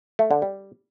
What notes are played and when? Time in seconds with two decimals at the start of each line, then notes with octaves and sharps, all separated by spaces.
0.19 A3
0.31 D3
0.42 G3